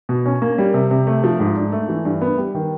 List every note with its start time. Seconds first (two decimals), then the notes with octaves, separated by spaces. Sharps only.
0.09 B2
0.26 C#4
0.42 A#3
0.58 G3
0.74 C3
0.91 C3
1.07 A3
1.24 F3
1.40 G#2
1.56 D4
1.72 A3
1.89 E3
2.05 G2
2.22 B3
2.38 G3
2.55 D#3